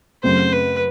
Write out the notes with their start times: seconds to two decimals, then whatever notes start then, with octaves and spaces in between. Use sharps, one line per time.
0.23 F#2 C#3 F#3 A3 C4 C5
0.52 B4